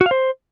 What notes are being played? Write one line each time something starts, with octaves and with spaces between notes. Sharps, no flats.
F#4
F5
C5